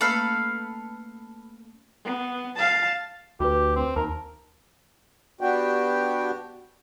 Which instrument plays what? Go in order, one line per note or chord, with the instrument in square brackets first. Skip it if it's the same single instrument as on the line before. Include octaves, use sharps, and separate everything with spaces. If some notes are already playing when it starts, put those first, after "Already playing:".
[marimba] A3 A#3 C#4 [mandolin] A4 B4 F5
[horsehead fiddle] B3
F5 A5
[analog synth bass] D2 [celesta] F#4 B4 [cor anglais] G4
[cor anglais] C4
[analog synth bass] D#2 [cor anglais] A#4 [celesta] A5
[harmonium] B3 D4 F#4 G4 G5